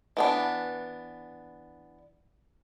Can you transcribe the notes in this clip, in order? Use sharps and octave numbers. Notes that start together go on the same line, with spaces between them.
E3 B3 D4